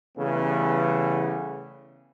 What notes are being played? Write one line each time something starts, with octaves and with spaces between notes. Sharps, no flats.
C#3 E3 G3 A3 B3